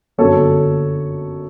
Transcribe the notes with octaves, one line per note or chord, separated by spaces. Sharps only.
G1 F#2 D3 A4 C#5